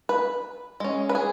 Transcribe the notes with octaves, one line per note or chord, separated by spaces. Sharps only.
B4
G#3 C#4
B4
G#4